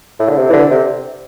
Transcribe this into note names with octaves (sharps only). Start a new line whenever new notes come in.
A2
D3
C3
E3
D3
C3